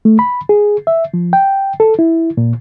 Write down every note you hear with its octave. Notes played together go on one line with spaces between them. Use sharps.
A3
B5
G#4
E5
F3
G5
A4
E4
A#2